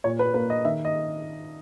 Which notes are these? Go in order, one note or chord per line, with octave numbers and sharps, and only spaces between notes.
A#2 C#5
B4
A#3 B4
D#5
D#3 E5
D#5